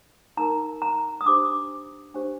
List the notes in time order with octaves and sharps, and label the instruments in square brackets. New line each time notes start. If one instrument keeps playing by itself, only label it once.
[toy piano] D#4 A#4 A#5
A#5
D#6
D4 G4 C5 D6
D4 G4 C5